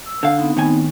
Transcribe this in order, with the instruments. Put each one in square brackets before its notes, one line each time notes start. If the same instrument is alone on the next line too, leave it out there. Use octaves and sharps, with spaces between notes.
[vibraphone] E6
[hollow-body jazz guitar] D3 F5
[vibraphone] B3 C4 D#4
[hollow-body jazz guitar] A2 D#3 G#5